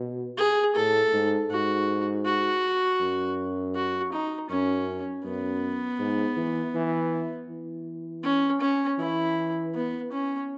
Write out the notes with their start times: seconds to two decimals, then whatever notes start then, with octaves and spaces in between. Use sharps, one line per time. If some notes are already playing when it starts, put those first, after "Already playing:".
Already playing: B2
0.38 G#4
0.75 A2 A4
1.13 G#2
1.51 G#2 F#4
2.26 F#4
3.00 F#2
3.75 F#4
4.12 D#4
4.50 F#2 C#4
5.24 F#2 B3
5.99 G#2
6.37 E3
6.74 E3
7.49 E3
8.24 C#4
8.61 C#4
8.99 E3 E4
9.75 B3
10.12 C#4